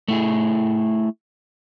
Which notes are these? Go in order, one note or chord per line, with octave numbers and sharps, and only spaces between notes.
A3 E4 G#4